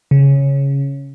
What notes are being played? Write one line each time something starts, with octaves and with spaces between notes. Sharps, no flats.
C#3